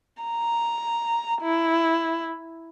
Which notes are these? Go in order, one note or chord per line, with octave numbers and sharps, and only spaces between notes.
A#5
E4